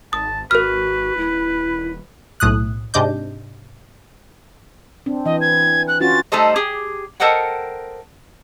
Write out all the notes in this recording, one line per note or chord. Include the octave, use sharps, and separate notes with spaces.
G#1 A5 D#6
G#1 F#4 A#4 B4 F6
D#1 E4
B1 A2 D#6 F#6
G#2 C3 D4 D#5 D6 G6
C4 D4
E3 D#5
G#6
F#6
C#4 F4 F#4 A6
G3 A3 D#4 A4 C5 D#5
G4 G#4
A4 A#4 C5 D#5 F#5 G5